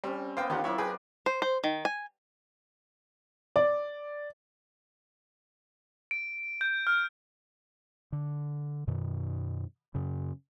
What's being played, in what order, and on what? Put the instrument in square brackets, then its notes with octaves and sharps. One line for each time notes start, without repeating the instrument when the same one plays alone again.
[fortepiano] G3 [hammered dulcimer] C4 C#4
[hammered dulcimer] A#3 B3 D#5 [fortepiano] C5 F5 G5
[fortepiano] D#3 G4 F#5 [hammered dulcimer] C4 D4 F4
[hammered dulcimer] F#3 A#3 [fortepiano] E4 C#5
[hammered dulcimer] F#4 [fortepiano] G#4 B4 G5
[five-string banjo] C5
C5
D#3
G#5
[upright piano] D5
[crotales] D7
G6
F6
[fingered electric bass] D3
F#2 B2 D#3
F#2 C#3